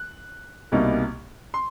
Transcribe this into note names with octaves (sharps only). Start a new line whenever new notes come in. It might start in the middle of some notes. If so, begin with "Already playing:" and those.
Already playing: F#6
C2 B2 G3 A#3 D#4
C6